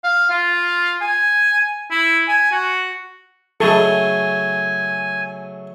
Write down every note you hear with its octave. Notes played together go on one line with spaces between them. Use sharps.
F5
F4
G#5
E4
G#5
F#4
C#3 F#3 A3 G#4 A4 G#5